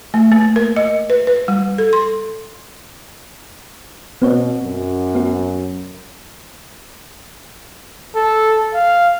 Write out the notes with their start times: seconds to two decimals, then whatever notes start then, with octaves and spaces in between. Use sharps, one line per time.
0.14 A3
0.32 A#3
0.56 A#4
0.76 D#5
1.10 B4
1.27 B4
1.48 G3
1.78 A4
1.93 C6
4.22 B2 B3 C4 C#5
4.63 F#2
5.15 B3 F#4
8.15 A4
8.75 F5